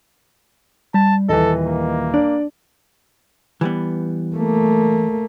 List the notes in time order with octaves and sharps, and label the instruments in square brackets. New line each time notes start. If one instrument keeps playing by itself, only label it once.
[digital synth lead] G3 [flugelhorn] A5
[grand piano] D#1 E3 [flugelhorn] A4 [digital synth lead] D#5
[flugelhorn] A#3
[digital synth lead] D4 [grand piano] D5
[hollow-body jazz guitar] E3 G3 B3
[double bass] A3 A#3